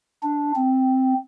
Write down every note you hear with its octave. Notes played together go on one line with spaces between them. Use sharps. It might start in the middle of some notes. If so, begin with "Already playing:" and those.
D4
C4